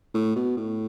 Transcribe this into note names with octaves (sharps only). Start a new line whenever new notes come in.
A2
B2
A2